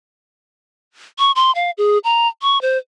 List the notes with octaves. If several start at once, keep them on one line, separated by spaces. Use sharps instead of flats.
C#6
C6
F5
G#4
A#5
C#6
C5